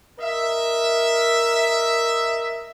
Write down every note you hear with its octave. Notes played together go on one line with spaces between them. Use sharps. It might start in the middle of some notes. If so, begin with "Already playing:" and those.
A#4 D#5 E5